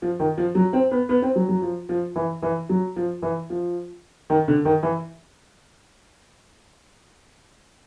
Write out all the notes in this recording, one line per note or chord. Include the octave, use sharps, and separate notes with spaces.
F3
D#3
F3
F#3
C4
B3
B3
C4
F#3
F#3
F3
F3
E3
E3
F#3
F3
E3
F3
D#3
D3
D#3
E3